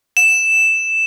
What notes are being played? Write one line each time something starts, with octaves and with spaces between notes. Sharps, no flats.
E7